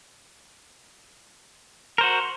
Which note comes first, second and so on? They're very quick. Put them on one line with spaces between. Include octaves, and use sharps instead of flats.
A#4 C5 F#4